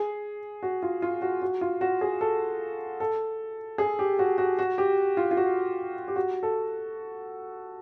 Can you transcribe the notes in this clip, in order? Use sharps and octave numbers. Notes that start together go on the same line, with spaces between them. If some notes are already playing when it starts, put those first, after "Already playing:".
Already playing: G#4
F#4
F4
F4
F#4
F#4
F4
F#4
G#4
A4
A4
G#4
G4
F#4
F#4
F#4
G4
F4
F4
F#4
G4
F#4
A4